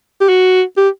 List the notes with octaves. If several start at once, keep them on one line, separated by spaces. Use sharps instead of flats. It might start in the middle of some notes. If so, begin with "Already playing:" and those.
G4
F#4
G4